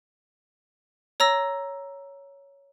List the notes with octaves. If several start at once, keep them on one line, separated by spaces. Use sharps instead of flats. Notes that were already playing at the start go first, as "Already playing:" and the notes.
C#5 A#5 E6 A#6